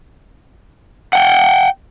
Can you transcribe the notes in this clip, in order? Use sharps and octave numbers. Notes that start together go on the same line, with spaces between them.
F#5 G5